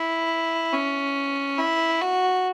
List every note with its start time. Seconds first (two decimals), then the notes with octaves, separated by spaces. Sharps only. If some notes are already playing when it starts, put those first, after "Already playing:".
Already playing: E4
0.73 C#4
1.58 E4
2.01 F#4